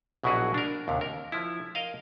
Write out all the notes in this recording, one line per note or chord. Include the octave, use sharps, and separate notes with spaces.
A#1 B2 F#3 E4 F#4 G#4
D4 A#4
D#2 C3
A#4
F3 E4
A#4 D#5 F5